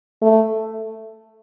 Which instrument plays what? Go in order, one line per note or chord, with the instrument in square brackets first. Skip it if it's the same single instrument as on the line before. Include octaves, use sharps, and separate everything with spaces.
[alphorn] A3